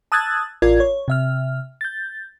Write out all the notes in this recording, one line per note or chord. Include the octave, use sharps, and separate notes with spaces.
A5 D#6 E6 F#6 G#6 A6
A1 F4 A#4 D5 G#6
C#5
C3 E5 F6
G6 A6